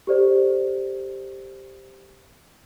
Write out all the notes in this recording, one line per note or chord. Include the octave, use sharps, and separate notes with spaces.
G4 A4 C5 D5